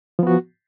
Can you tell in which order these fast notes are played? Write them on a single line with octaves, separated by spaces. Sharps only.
F3 B3 F#4